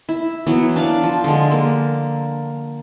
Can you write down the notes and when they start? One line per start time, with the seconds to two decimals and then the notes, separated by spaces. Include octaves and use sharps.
0.09 E4
0.46 E3 F#3 B3
0.76 D4 D5 F5
1.03 F3
1.24 D3 G#3
1.51 A#3